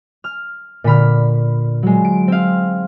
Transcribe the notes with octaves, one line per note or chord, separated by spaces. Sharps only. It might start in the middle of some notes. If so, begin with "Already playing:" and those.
F6
A#2 D3 B5 F6
F#3 G#3
D7
C4 F5